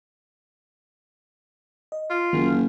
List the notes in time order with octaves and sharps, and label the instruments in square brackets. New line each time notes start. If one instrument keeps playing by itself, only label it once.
[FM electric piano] D#5
[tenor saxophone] F4
[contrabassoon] F#1 [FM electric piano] D#3 A#3